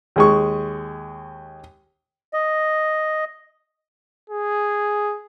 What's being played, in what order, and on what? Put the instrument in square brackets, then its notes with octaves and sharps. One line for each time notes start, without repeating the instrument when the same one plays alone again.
[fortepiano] D#2 G#3 C#6
[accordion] D#5
[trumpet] G#4